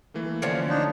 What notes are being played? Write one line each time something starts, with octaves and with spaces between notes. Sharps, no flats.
E3 A3 A#3
D3 F3 C#4
D4 D#4